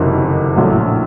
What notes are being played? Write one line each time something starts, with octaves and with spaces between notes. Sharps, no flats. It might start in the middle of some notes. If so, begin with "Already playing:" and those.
Already playing: F#1 F2 C3 D#3 F#3
A#1 A2 F#3